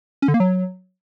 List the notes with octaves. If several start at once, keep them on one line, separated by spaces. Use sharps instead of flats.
C#4
D3
A#3
F#3